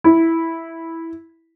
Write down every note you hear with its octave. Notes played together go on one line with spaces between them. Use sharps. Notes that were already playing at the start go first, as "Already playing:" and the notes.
E4